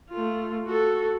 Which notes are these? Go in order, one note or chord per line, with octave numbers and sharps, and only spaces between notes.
A3 F4
F#4 A4